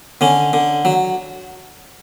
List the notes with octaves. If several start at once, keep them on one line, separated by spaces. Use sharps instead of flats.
D3 C#4
D3
F#3